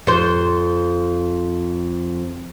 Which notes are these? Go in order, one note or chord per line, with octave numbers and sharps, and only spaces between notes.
F2 C5